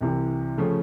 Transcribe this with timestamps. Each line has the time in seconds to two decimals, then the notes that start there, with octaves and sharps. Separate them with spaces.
0.01 C2 C3 E3
0.57 C#3 F3 A3 C#4